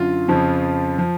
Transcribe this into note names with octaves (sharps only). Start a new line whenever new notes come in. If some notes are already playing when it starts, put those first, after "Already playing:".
Already playing: F#2 D3 F4
F2 C#3 F3
F3